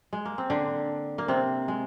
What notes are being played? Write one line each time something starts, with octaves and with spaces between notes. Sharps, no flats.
G#3
A#3
C4
D3 D4
A#3
C3 C4
G#3